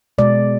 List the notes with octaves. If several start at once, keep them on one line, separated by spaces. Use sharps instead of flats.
B2 G#3 D5